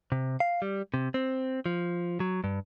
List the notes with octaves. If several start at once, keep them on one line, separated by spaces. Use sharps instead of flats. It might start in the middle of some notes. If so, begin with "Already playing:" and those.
C3
F5
G3
C3
C4
F3
F#3
G2